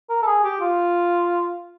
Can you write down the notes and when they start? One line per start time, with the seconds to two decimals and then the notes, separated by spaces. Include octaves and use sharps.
0.09 A#4
0.22 A4
0.27 G#4
0.44 G4
0.60 F4